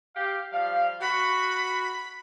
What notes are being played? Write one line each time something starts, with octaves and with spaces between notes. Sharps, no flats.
G4 F5
F3 G3 F5
F#4 B5